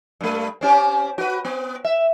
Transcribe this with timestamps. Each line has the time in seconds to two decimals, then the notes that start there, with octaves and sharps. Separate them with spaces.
0.21 G2 A3
0.61 C4 C#4 G4
1.18 F#4 B4
1.45 B3
1.85 E5